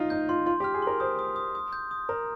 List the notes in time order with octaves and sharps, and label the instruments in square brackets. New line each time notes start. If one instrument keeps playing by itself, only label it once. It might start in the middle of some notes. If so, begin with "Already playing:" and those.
Already playing: [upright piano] D#4 F4
[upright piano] D#4 [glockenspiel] G6
[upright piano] F4 [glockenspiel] C6
[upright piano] F4 [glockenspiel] C6
[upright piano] G4
[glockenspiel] F6
[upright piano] G#4
[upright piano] A#4 [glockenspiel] C6
[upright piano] C5 [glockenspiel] D#6
[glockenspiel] D#6
D#6
D#6
G6
D#6
[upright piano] A#4 [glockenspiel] A#5